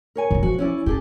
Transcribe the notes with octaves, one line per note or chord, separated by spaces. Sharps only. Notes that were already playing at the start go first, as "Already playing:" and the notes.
A#4 C#5 G#5
D#3 E4
F3 F#4
C#4 E4 D5
C#4 G4 G#4 A5